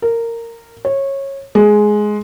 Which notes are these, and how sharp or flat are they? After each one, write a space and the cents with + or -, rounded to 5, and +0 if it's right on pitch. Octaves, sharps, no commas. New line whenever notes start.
A#4 -15
C#5 -20
G#3 +10